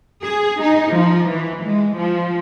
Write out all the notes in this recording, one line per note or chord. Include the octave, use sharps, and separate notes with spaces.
G#4
D#4
F3
E3
G#3
F3